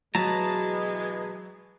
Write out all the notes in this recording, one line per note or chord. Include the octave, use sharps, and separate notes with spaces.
B2 E3 F#3 G#3 B4 A5 A#5